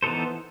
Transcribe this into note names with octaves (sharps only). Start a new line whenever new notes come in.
E3 B3 D#4 A4 C5